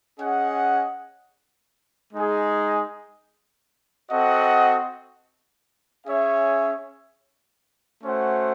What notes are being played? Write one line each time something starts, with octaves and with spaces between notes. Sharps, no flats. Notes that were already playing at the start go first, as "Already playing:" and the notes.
C#4 G#4 D#5 F#5
G#3 D#4 G#4
C4 F#4 A4 D#5 F#5
C#4 G#4 C#5 E5
A3 C#4 F#4 C5 F#5